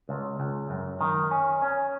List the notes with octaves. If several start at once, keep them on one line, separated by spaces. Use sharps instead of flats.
C#2
C#2
F#2
D#3
C#4
C#4